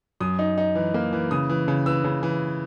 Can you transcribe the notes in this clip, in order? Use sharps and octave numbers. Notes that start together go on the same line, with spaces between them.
F#2 D#6
D#4
D#4
E3
A#3
E3
C#3 D#6
E3
C#3
E3 E6
C#3
E3